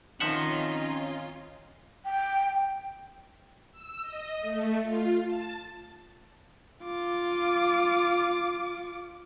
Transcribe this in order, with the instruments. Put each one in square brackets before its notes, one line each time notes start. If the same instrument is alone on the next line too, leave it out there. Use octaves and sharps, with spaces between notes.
[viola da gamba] D#3 C4 [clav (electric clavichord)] F3 E5 F#5 [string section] C#4 D#4 F4
[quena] G5
[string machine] E6
D#5
A3
F4
A5
[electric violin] F4 D6